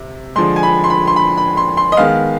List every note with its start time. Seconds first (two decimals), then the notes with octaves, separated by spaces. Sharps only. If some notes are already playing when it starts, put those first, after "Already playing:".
Already playing: C3
0.36 D3 F3 G#3 C6
0.56 G#5
0.63 B5
0.84 C6
0.90 B5
1.07 C6
1.16 B5
1.37 B5
1.57 C6
1.77 C6
1.92 D#5
1.97 D#3 G#3 B3 F5